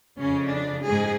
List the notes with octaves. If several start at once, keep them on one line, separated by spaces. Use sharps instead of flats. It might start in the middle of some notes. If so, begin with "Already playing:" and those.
F2 C#3 C#4
D4
G#2 G#4